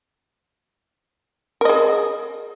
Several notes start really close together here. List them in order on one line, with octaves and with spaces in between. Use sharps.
A#4 D#5 G#4